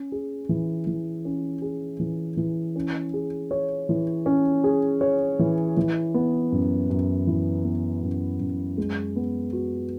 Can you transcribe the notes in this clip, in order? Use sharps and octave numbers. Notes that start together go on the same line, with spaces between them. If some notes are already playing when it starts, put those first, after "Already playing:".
Already playing: C#4
G#4
E3
E3
C#4
G#4
E3
E3
C#4
G#4
C#5
E3
C#4
G#4
C#5
E3
E3
B3
F#2
F#2
E3
B3
F#2
F#2
G#3
B3
F#4